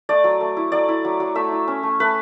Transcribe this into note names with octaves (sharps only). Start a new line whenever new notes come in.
A3 D5
F#3
A3
E4
F#3 D5
E4
F#3
F#3
A3 E5
E4
C#4
A3
A3 B4